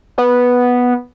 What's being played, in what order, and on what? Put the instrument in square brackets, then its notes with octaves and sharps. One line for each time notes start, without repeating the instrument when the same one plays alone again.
[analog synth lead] B3